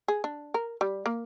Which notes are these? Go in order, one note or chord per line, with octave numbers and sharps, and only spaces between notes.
G#4
D4
A#4
G3
A#3